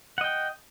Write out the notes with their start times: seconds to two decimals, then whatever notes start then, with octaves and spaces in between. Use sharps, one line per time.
0.18 F#5
0.21 D#5
0.24 G5